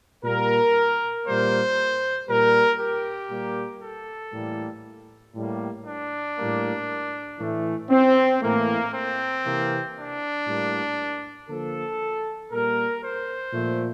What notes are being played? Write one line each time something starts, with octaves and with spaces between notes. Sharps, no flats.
A#2 G3 A#3 A#4
A#2 G3 A#3 C5
A#2 G3 A#3 A#4
G4
A#2 G3 A#3
A4
A2 E3 G3 A#3
A2 G3 A#3
D4
A2 G3 A#3
A2 E3 A3
C4
A2 E3 A3 A#3
C4
C3 E3 A#3
D4
A2 G3 A#3
D3 F3 A#3 A4
A#2 G3 A#3 A#4
C5
A#2 F3 A3